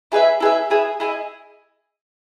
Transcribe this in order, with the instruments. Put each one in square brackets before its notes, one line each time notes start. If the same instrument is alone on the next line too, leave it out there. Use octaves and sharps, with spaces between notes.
[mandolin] E4 G#4 B4 E5
E4 G#4 B4 E5
E4 G#4 B4 E5
E4 G#4 D#5